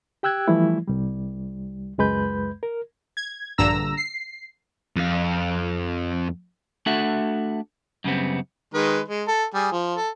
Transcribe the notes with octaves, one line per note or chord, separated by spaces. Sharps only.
G4 G5 E6 F#6 G#6
E3 F3 G3 A3 E4
C2 G3
C#2 F#2 G#3 B4 B5 G6
A#4
G#6
A#1 G2 D3 A#5 E6 A#6
C7
F2 F5
A3 D4 F#4 A4 E5 F#5
F#2 C#3 G3 B3 C4
D#3 G#3 B4
G#3
A4
G3 G#4
F3
A4